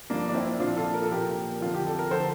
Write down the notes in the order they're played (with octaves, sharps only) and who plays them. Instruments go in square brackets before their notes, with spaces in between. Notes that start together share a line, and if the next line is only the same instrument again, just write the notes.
[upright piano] G2 F3 A#3 D4
D4
C4 E4
A#2 F3 D4 F4
F4 A4
A#4
A4
A#2 F3 G4 A#4
F2 D3 F3 F4
G4
A4
A#4
D3 F3 A4 C5